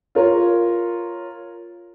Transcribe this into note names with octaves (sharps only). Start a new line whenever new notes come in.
F4 A#4 C#5